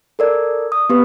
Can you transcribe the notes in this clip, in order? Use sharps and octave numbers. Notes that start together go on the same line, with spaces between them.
A4 A#4 D5
D#6
B3 G4 B4